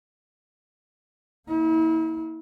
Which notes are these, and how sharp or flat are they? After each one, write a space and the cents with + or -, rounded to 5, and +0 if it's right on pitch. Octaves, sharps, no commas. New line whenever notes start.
A#3 +0 E4 -40